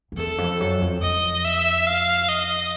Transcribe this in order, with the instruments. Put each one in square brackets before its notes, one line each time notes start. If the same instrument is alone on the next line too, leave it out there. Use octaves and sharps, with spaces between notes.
[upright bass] F2
[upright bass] E2 [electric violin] A4
[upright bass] F2
F#2
F2
[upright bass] F2 [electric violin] D#5
[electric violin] E5
F5
D#5